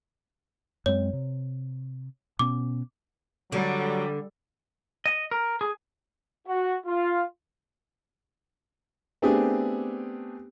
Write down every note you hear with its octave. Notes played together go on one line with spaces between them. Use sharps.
F#2 G#3 C4 C#5
C3
B2 B3 C#4 D6
D3 F#3 G3
D#5
A#4
G#4
F#4
F4
A3 B3 C4 D4 G4 G#4